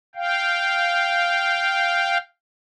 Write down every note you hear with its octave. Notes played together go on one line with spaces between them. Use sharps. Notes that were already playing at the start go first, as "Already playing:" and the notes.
F5 G5